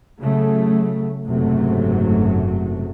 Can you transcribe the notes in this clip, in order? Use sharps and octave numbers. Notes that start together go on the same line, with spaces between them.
C#3 F#3 A3
F#1 G#2 C3 F#3 A3